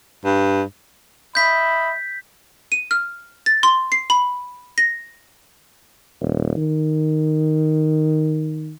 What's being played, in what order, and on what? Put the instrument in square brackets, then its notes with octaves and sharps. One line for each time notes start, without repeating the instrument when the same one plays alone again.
[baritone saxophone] G2
[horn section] D#5 E5 B5 [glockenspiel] G6 B6
[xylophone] D#7
F6
A6
C6
C7
B5
A#6
[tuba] D#1
D#3